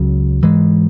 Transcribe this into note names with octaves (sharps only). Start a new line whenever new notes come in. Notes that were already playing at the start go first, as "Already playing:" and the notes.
Already playing: C#2 C#3 F#3
G#2 E3 G#3